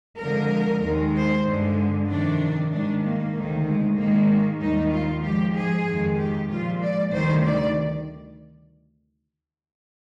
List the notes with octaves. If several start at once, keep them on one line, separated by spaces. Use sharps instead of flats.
F2 D3 F3 G#3 A#4
D#2 D#3 G#3
C5
G2 D3 G#3
F2 C3 D#3 D4
G#2 D#3 G3 D4
A#3
D2 C3 D#3
G#3
G#2 D#3 G#3 A#3
D#2 D#3 G3 D#4
F4
G#2 F3 G#3 G4
G#4
F2 D#3 G#3
G4
A#2 F3 G#3 F4
D5
D2 C3 D#3 G3 C5
D5